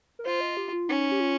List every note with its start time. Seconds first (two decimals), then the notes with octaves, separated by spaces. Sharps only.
0.19 A#4
0.25 F4 C5
0.41 D#5
0.57 G4
0.73 F4
0.89 C#4 D#4
1.12 G4
1.20 F4